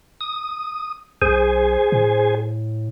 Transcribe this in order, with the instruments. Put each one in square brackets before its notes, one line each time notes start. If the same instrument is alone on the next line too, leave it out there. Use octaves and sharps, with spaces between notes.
[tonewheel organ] D#6
[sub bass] B1 [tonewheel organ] G#4 C5 G#5
[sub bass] A2